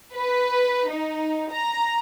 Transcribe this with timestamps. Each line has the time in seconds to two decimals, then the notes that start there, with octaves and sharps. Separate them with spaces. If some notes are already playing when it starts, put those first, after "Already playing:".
0.15 B4
0.90 D#4
1.51 A#5